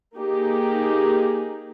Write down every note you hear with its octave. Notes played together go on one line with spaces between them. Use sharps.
A#3 D#4 G4 G#4